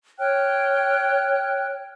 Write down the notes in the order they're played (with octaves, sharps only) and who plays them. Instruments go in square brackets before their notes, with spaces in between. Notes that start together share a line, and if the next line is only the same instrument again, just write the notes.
[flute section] C#5 G5 F6 F#6